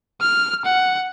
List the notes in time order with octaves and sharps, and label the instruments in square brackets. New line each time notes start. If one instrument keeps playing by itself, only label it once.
[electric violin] F6
F#5